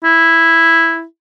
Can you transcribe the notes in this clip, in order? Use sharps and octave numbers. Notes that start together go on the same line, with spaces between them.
E4